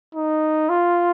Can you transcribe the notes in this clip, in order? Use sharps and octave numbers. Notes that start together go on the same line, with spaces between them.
D#4
F4